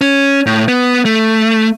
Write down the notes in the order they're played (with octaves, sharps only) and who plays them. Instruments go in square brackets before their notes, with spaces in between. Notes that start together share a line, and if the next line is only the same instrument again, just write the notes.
[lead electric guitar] C#4
A2
B3
A3